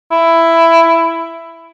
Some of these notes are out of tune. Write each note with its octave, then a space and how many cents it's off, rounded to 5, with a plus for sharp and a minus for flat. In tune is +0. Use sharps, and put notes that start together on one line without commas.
E4 +10